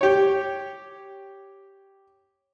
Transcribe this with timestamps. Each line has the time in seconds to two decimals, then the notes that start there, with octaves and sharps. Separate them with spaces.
0.01 G4 C#5